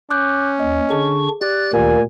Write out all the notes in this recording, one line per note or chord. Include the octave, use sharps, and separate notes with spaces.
C#4 D6 F#6 G6
D#2 D#5
D3 D4 G#4 C#6
G4 D5 F#6 A6
D2 A#2 D#3 G#5